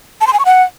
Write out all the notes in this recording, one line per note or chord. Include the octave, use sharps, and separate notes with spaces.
A5
C6
G#5
C#6
F#5